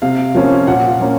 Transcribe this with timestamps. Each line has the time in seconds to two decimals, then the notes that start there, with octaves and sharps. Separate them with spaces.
0.02 C3 F5
0.35 F3 A#3 C#4
0.67 A#2 F#5
0.89 F5
0.99 F3 A#3 C#4